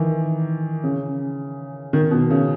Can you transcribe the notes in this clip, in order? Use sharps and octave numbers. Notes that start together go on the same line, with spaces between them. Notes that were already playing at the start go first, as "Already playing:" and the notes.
Already playing: D#3 E3
C#3
D#3
B2
C#3